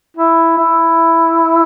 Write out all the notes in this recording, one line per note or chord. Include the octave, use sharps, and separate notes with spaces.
E4
E4